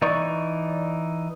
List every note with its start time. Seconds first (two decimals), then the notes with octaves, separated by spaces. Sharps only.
0.02 E3 D#4 D5 C#6